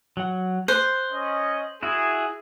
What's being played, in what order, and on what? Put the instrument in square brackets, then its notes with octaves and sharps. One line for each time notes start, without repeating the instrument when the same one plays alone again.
[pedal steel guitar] F#3 F#5
[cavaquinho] C5 [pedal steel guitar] F#6
[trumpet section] C#4 D#5
[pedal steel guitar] E4 F#4 [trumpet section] G#4